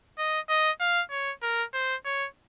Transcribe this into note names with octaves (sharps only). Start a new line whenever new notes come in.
D#5
D#5
F5
C#5
A#4
C5
C#5